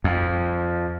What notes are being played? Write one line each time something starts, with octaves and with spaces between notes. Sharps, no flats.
F2